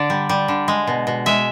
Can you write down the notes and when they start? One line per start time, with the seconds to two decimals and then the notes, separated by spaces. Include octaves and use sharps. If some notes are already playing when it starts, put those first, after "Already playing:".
Already playing: D3 D5
0.10 G3
0.29 G3
0.48 D3
0.68 G#3
0.87 B2
1.07 B2
1.26 G#3 E5